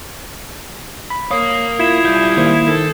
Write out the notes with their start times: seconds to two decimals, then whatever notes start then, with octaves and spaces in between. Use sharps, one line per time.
1.10 B5
1.31 A#4 C#5 F5 D#6 C7
1.80 E4 F4 G#6 E7
2.05 G3 E5 G6
2.37 D#3 A#3 C5
2.68 D#3 A4